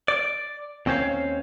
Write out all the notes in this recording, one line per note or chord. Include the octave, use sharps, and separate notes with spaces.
D5
D#2 C4 C#4 C5 C#5 F5